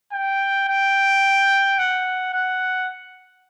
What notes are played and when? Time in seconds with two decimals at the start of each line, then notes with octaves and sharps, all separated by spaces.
0.13 G5
0.68 G5
1.79 F#5
2.34 F#5